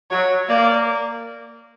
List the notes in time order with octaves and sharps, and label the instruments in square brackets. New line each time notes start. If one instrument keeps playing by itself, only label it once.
[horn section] F#3 [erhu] C#5
[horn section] A#3 [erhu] D5